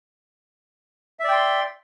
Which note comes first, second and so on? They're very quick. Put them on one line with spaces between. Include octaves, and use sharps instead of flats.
E5 D5 G5 C6